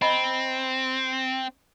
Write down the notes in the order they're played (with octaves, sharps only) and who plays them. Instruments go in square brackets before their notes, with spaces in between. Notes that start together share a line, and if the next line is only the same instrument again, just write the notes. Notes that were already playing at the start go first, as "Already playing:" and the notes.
[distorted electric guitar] C4 [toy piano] D#5 A#5 B5